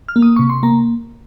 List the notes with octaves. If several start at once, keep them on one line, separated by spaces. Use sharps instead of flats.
F6
A#3
D#6
C3 C#6
C6
A#3 A#5